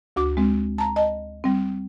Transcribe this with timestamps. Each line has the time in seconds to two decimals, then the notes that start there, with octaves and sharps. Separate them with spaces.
0.16 D2 F#4 D6
0.37 G#3 C4
0.78 A5 A#5
0.96 D#5 A5
1.44 G3 C4